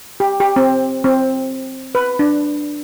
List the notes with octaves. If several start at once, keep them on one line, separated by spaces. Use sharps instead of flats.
G4
G4
C4
C4
B4
D4